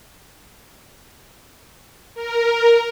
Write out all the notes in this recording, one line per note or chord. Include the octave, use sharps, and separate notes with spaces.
A#4